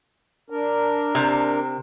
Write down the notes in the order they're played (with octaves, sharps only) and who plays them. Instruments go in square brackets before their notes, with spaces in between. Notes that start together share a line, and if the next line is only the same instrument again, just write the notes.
[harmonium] D4 A#4
[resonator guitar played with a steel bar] C3